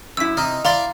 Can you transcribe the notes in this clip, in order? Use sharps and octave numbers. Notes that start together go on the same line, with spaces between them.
F#2 E4 E6 B6
C3 D#4 F6
E4 D5 F5 A#5 C6 A6